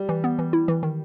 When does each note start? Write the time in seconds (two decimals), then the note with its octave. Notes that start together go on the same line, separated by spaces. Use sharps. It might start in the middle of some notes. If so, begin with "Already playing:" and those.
Already playing: G3
0.09 E3
0.24 B3
0.39 E3
0.53 E4
0.68 E3
0.83 D#3